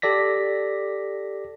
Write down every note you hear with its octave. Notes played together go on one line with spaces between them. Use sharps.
G4 A4 D5 A#6 B6